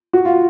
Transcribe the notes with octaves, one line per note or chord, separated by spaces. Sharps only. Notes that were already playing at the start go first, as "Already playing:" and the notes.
F#4
F4